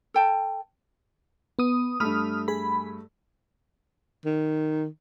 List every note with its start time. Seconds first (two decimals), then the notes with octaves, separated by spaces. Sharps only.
0.14 A4 G5 A5
1.59 B3 D#6
2.00 G2 A3 B5 D#6 F6
2.48 G#4 B5
4.26 D#3